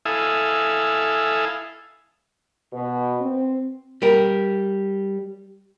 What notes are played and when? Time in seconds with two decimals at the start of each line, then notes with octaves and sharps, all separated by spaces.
0.05 E4 A4 E5 F5 G#5 D#6
2.72 B2
3.20 C4
4.02 G3 A#4